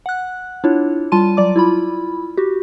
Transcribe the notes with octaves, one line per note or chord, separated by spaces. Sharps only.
F#5 F#6
D4 E4 F4 C#5
G3 F4 A5 C6 D#7
F#3 D5 D6
E4 F4 B5
F#4 G4